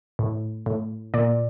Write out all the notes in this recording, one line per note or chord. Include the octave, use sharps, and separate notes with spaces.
A2
A2
A#2 D5